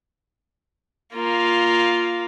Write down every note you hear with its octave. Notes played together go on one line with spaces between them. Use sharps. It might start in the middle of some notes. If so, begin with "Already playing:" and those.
A#3 F4